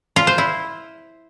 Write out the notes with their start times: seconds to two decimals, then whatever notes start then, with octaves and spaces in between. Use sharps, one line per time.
0.16 F4
0.27 C5
0.38 E4